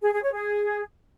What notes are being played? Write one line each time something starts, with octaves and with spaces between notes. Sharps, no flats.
G#4
G#4
C#5
G#4